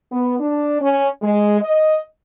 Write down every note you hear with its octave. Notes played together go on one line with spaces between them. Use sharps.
B3
D4
C#4
G#3
D#5